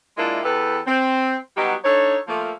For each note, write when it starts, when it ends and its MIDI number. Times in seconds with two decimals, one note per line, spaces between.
0.18 0.40 46
0.18 0.40 56
0.18 0.40 58
0.18 0.40 62
0.18 0.40 64
0.44 0.79 40
0.44 0.79 67
0.44 0.79 69
0.44 0.79 71
0.86 1.35 60
1.57 1.73 54
1.57 1.73 55
1.57 1.73 59
1.57 1.73 63
1.57 1.73 66
1.57 1.73 67
1.84 2.16 62
1.84 2.16 63
1.84 2.16 69
1.84 2.16 73
2.28 2.52 53
2.28 2.52 57
2.28 2.52 58